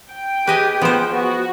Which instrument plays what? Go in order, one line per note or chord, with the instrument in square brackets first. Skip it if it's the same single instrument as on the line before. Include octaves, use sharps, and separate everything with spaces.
[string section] G5
[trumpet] G4 [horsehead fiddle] G#4 [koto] B4 D#5 G#5
[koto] F3 C5 [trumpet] B3
[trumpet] B3 [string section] F#4